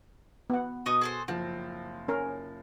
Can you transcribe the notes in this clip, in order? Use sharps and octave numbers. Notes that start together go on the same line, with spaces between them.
B3 F#5
B2 D#5 C#6 D#6
G#4 A4 C5
F#1 F3 C4
C#4 A#4